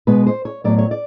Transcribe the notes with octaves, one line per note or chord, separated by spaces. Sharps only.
B2 G#3 B3 B4
C5
C#5
A2 F#3 B3 D5
C#5
D5